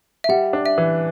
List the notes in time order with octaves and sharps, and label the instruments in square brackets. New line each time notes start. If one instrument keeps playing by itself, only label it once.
[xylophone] E5
[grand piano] G3 [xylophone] F#5
[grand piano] D4
[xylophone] E5
[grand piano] E3